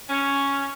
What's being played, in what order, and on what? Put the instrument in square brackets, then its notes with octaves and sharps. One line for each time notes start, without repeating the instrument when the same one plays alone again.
[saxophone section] C#4